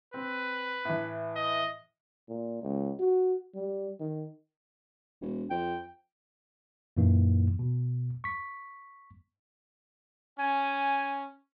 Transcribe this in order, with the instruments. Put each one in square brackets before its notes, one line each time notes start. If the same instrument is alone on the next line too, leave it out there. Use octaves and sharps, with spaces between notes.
[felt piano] C4 [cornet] B4
[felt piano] A2 E3
[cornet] D#5
[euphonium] A#2
C#2
F#4
G3
D#3
[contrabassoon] E1
[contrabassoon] F2 [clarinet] G5
[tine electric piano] F#2 A#2 E3 A#3 D#4
B2
C#6 B6
[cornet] C#4 [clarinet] G#5